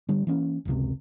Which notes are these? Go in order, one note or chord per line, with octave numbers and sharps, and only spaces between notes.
D3 G3
E3 A#3 C#4
F1 C#2 C3